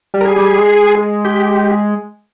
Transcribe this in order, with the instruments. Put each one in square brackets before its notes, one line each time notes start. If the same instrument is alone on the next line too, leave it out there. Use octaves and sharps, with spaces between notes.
[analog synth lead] G3
[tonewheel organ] A#4
G#4
[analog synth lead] G3
G#3
[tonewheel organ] G4